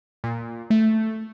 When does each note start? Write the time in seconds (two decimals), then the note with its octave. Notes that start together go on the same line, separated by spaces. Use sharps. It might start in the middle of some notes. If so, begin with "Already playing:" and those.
0.24 A#2
0.70 A3